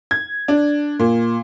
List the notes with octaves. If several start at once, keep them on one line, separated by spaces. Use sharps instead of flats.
G#6
D4
A#2